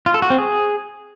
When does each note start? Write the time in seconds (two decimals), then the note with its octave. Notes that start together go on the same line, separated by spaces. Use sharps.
0.06 F4
0.14 A4
0.22 F#4
0.30 C4
0.38 G#4